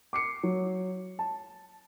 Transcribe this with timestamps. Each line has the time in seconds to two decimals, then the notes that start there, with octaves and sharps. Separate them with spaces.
0.13 D6 C7 C#7
0.43 F#3
1.19 A5